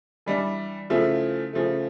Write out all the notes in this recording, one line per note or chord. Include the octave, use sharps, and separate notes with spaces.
E3 G3 D4
C#3 F3 A3 E4
C#3 F3 A3